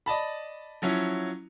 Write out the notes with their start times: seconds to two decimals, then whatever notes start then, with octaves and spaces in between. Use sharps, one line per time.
0.06 D5 D#5 A5 B5
0.82 F3 F#3 C#4 E4